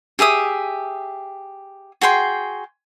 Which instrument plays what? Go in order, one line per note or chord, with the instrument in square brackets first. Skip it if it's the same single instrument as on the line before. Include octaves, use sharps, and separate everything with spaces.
[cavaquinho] G4 G#4 E5 D#6
F#4 G#4 G5 C6